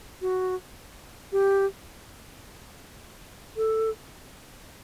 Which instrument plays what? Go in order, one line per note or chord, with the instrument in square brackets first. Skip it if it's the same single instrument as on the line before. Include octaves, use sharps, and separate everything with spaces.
[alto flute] F#4
G4
A4